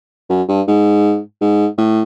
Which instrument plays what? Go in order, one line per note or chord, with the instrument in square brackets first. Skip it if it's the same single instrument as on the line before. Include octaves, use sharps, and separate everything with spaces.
[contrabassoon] F#2
G2
G#2
G#2
A2